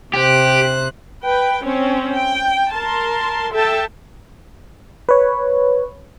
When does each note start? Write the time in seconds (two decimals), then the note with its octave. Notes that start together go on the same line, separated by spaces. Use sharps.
0.14 C3 G4 C5 F#6
1.25 B4 G5
1.65 C4 C#4 C#5
2.14 G5
2.74 A#4 A5 C6
3.53 A4 E5 G5 A5
5.09 B4 C#5